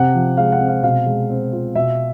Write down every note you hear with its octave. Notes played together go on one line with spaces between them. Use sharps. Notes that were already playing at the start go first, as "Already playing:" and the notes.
Already playing: C3 F#5
F3
G#3 F5
F#5
C4
F5
B2 F5
G#3
C4
F4
B2 E5